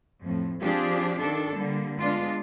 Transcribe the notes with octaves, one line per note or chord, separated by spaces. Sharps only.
F2 A2
F3 C4 D4 F4 G4 G#4
D#3 D4 A4
D3 G3 A#3
G#3 B3 D4 F4